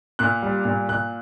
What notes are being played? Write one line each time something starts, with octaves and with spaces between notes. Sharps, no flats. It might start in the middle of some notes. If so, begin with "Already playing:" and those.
A#2 F#6
G3
A#2
A#2 F#6